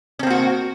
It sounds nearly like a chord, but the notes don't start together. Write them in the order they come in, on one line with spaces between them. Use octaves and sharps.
C#4 C4 A#3 F#4